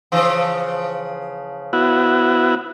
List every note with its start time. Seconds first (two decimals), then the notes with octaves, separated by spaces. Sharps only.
0.12 C#3 E3 F3
1.73 B3 E4 F#4